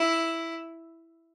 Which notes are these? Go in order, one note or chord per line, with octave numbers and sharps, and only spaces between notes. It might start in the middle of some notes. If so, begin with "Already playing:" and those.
Already playing: E4